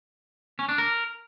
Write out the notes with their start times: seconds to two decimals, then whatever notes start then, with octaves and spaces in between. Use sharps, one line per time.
0.59 C#4
0.69 D4
0.78 A#4